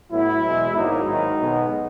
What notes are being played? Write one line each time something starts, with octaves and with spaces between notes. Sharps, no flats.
A2 F#3 B3 E4
E2 B2 G#3 B3
G#1 G#2 D#3 F#3 A#3 D#4
G#2 D#3 F#3
B1 B2 G#3 B3